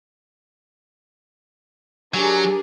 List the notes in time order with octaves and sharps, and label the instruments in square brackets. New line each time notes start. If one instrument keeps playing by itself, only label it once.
[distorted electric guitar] F#3 [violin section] D4 G#4 A#4 [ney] G4